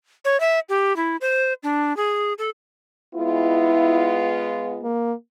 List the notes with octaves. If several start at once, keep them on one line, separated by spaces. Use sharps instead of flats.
C#5
E5
G4
E4
C5
D4
G#4
A4
G#3 B3 E4 F4
A#3